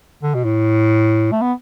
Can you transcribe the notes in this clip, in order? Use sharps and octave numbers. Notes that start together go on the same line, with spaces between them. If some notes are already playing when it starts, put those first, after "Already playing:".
D3
B2
A2
A3
B3